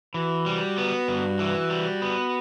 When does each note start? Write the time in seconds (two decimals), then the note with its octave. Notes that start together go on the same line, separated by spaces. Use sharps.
0.14 E3 F#4
0.46 G3
0.78 B3
1.08 G2
1.39 E3
1.70 G3
2.02 B3